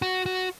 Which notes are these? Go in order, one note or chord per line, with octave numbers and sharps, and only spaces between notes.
F#4
F#4